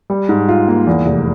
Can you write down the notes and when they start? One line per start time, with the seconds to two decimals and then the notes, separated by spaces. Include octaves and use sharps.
0.10 G3
0.29 G#2
0.49 F4
0.68 A#3
0.87 E2
1.06 F1